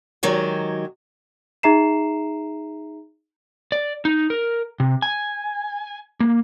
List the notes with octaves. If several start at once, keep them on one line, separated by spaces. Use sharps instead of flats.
D#3 F#3 G#3 G4
D#4 G#4 E5 A#5 C7 E7
D5
D#4
A#4
C3
G#5
A#3